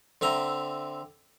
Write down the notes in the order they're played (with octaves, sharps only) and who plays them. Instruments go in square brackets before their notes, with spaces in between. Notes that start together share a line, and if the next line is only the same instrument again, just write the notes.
[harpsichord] D3 C4 E5 A#5